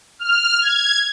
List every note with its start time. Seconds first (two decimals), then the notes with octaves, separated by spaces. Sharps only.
0.19 F6
0.61 G#6